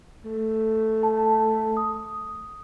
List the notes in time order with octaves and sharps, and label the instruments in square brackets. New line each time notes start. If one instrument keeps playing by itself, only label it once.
[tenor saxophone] A3
[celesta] A5
D#6